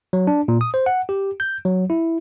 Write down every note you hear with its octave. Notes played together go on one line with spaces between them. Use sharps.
F#3
D4
A#2
D#6
C5
F#5
G4
G6
F#3
E4